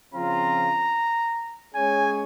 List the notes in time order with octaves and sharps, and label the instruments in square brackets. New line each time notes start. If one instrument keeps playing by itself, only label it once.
[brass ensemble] C#3 F3 C4 F4 [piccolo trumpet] A#5
[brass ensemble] G#3 C#4 G#4 C#5 [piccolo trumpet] G#5